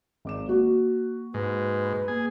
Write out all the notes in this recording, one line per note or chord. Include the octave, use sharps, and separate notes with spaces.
G#1 D6 E7
A#3 F#4
G#2 B4
A#3 G#4